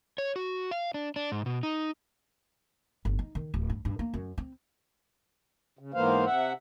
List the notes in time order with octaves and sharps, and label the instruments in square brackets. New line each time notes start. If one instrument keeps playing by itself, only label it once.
[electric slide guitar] C#5
F#4
F5
D4
D4
G#2
B2
D#4
[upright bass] G1
D#4
D#3
D1
G2
G2
A#3
F#2
C4
[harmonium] C#3
G#2 E3 A#3 B3 C5 F5
C3 E5 F#5